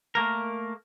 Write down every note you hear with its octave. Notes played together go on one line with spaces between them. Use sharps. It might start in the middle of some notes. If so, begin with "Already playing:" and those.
A3 A#3 A#4